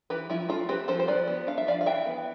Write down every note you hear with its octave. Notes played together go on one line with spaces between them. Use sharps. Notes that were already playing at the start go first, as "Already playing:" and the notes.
E3 G4 B4
F3 E4
A3 F4 A4
C4 G4 B4
F3 A4 C5
C5
F3 B4 D5
B3
D4 F5
E5
F3 D5 F5
F5
E3 E5 G5
B3